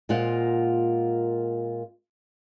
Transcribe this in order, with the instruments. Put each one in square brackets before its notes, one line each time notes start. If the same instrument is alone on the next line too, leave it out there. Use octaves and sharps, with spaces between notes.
[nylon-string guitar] A#2 G#3 A#3 F4 C5 F#5